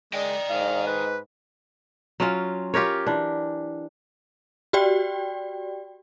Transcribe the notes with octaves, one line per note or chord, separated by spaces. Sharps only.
G#3 D5 D#5 G5
G#2 F5
B4
F#3 C#4 F4
F4 G4 A#4 C#5
E3 D4
F#4 G4 D5 G5